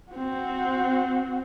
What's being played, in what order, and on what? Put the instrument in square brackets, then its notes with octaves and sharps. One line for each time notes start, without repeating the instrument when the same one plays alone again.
[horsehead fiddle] C4 F#4